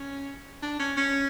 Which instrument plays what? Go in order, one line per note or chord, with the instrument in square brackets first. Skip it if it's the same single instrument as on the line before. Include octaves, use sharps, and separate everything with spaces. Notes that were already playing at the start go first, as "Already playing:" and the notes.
Already playing: [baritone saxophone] C#4
D4
C#4
C#4